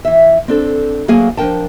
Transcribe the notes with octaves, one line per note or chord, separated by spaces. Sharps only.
E3 E5
C4 D4 A4
D2 F#3 A#3 G#4 F5 G#5
F3 D4 A#4 G5 A5